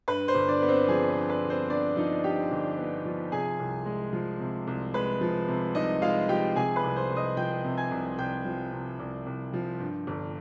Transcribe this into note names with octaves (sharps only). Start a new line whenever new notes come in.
G2 B4 B5
C5 C6
G1
D4 D5
B3
C4 C5
F3 G#4
B4
G2
B4
G1
C4 C5
B3 D4 D5
F3 D#4 D#5
G2 G4 G5
G1
B3
F3
C3 G#4 G#5
C2
G#3
F3
C3
C2
G#3 B4 B5
F3
C3
C2 D#4 D#5
G#3 F4 F5
F3 G4 G5
C3 G#4 G#5
B4 B5
C2
C5 C6
C2
D#5 D#6
F3 G5 G6
C3
G#5 G#6
C2
C2 G5 G6
F3
C3
C2
C2
F3
G2
G1